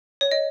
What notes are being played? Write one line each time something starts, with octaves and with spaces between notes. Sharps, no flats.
C#5
D#5